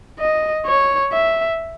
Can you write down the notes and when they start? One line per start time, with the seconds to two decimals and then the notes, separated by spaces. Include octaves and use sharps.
0.20 D#5
0.66 C#5
1.12 E5